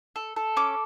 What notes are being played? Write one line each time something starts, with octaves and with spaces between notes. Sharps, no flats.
A4
A4
C#4 D6